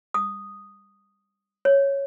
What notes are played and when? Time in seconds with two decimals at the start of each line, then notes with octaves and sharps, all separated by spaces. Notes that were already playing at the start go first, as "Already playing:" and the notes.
0.14 D#6
1.65 C#5